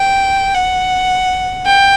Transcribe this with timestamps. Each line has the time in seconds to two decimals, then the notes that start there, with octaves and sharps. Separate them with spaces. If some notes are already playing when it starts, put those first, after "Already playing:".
Already playing: G5
0.54 F#5
1.66 G5